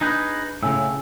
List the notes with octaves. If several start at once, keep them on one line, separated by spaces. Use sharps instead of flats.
D4 D#4 G#4 B4 G6
A2 C#3 G#5 E6